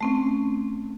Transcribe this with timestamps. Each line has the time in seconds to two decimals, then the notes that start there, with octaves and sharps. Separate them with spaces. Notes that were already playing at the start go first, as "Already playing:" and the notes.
0.01 A3 C4 C#4